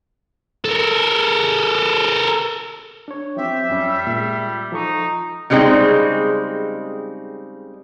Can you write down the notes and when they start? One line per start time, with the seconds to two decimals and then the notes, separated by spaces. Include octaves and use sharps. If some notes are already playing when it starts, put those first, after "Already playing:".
0.65 A4 A#4
3.08 D4 C#5
3.37 F3 C4 G4 E5
3.69 F#2 G3 C#4
4.07 A#2 G#3
4.72 F3 D#4 A4 C#6
5.50 C#3 G3 G#3 C4 D#4